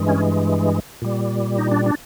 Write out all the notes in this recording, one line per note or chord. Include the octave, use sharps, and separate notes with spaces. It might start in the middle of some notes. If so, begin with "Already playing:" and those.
Already playing: G2 E3 G#3
C#4
A#2 G3
D#4
D4
D4